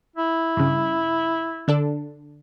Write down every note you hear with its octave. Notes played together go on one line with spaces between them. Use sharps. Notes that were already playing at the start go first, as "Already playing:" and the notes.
E4
G2 C#3
D3 D4 A4